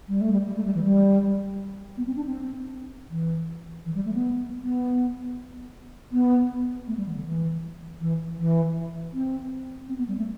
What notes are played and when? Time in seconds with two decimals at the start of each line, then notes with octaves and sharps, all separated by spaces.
0.08 G3
0.21 A3
0.32 G3
0.46 G3
0.55 A3
0.65 G3
0.74 E3
0.84 G3
1.97 B3
2.07 C4
2.16 D4
2.25 C4
3.10 E3
3.85 E3
3.95 G3
4.05 A3
4.14 B3
4.61 B3
6.12 B3
6.87 A3
6.97 G3
7.06 E3
7.15 D3
7.25 E3
8.01 E3
8.38 E3
9.13 C4
9.89 C4
9.98 B3
10.08 G3
10.17 A3